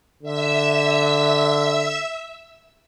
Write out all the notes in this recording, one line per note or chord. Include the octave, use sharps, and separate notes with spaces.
D3 E5 E6